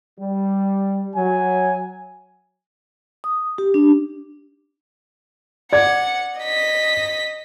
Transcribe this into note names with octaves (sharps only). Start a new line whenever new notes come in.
G3
F#3 G#5
D#6
G4
D4
D5 F#5 G#6
D#5 B6